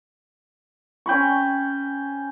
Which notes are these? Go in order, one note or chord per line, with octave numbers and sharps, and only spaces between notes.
C#4 G5 B5 C#6